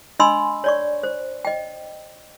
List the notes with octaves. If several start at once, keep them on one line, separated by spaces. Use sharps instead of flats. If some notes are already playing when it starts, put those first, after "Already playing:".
D4 D#5 G#5 B5 C6 E6
C#5 D5 C#6
C5
D#5 G5